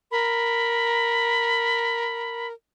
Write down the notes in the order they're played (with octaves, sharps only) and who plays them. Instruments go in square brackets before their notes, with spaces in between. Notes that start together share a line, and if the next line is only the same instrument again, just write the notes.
[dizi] A#4 [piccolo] B5